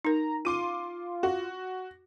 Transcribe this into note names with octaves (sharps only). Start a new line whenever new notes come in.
D#4 A#4 A#5
F4 C6 D6 D#7
F#4